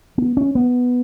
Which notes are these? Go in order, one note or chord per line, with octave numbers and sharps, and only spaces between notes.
B3
C#4
B3